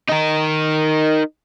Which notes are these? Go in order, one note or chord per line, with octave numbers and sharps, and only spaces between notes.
D#4 A#4